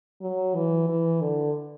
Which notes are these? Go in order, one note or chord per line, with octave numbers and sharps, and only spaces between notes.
F#3
E3
E3
D3